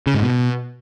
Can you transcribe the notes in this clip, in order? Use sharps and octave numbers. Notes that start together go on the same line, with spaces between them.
C#3
G#2
B2